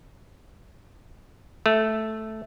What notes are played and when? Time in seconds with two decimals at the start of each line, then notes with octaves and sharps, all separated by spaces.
1.66 A3